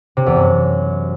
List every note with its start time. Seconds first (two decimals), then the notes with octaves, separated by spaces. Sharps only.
0.17 C3
0.26 E2
0.36 F#2